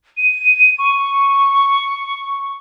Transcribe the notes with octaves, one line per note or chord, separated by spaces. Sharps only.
D#7
C#6